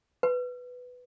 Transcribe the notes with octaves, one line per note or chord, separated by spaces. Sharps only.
B4